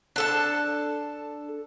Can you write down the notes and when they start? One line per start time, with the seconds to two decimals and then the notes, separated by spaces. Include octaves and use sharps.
0.16 D4 A4 A5